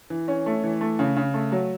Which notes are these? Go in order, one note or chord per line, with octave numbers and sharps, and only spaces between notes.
E3
C#4
A3
E3
A3
C#3
C#3
A3
F#3